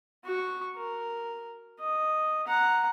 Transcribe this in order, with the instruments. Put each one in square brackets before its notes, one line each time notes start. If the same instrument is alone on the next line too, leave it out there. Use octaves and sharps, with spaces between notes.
[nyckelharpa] F#4 C#6
A#4
D#5
F#5 A#5